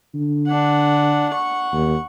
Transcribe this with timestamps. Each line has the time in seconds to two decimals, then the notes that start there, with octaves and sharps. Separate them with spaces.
0.15 D3
0.47 D4 F#5
1.30 F#5 C#6
1.73 D#2